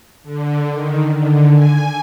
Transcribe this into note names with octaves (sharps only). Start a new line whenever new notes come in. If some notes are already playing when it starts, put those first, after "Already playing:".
D3
D#3
D3
G#5